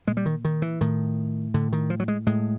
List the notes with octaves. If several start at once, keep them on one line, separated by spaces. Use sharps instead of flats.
A#2 G#3
G3
D#3
D#3
E3
A2 D#3
A2 D3
D#3
F3
F#3
G#3
A2 G#3